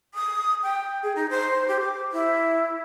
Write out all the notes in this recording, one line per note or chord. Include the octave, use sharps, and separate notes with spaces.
D#6
G5
G#4
D#4
C5
G4
D6
E4